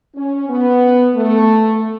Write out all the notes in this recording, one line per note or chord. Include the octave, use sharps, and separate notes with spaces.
C#4
B3
A3